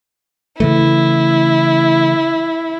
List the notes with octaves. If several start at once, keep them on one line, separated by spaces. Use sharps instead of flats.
C#3 E3 A3 E4